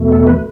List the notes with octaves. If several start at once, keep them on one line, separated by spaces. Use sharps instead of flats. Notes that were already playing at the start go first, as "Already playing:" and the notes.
Already playing: E2 B2 A3
A4
B4